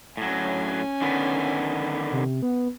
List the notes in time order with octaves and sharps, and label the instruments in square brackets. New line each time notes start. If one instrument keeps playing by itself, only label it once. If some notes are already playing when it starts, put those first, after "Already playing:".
[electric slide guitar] A2 F#3 [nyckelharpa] C#4 G#5
[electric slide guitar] D3 D#3 B3
[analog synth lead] C3
B3